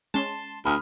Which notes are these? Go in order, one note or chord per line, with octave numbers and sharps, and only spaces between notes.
G#3 C#4 A5 C6
D2 B5 D#6 F6